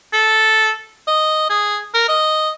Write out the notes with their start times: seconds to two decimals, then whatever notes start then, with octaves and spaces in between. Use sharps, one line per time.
0.13 A4
1.07 D#5
1.50 G#4
1.94 A#4
2.09 D#5